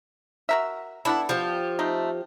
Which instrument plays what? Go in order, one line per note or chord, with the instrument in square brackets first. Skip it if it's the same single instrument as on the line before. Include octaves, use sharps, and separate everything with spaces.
[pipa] F#4 A#4 E5
[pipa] B3 D4 A4 [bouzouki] E4
[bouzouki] F3 G4
[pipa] A3 C4 D#4